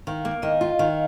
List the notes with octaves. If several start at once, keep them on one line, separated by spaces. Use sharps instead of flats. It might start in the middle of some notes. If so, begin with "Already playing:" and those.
D#3 F5
A#3
F5
D#3 D#5
F4
D#3 F5